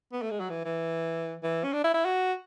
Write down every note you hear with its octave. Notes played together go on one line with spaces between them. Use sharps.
B3
A3
G#3
F#3
E3
E3
E3
C#4
D4
E4
E4
F#4